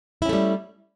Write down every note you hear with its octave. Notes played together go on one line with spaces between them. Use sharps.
G3 A3 C#4 E4